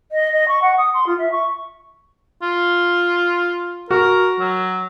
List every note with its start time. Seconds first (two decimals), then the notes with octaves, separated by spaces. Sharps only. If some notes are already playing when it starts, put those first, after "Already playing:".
0.12 D#5
0.33 D#5
0.48 C#6
0.62 F#5
0.78 D#6
0.94 C6
1.07 F4
1.19 E5
1.32 C#6
2.42 F4
3.91 F#4 A#4
4.39 F#3